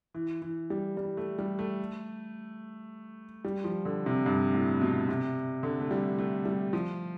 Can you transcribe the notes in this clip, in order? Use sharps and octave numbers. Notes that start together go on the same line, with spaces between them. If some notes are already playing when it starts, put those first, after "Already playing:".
E3
E3
G3
G3
A3
G3
A3
G3
F3
D3
C3
G2
A2
B2
C3
D3
A3
G3
A3
G3
F3